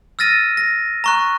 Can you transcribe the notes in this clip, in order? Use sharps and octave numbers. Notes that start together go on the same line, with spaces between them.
E6 F6 A6 A#6 D#7
A#6
A#5 C#6 F#6